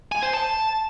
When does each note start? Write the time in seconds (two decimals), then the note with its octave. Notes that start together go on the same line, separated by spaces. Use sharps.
0.12 G#5
0.23 C5
0.33 A5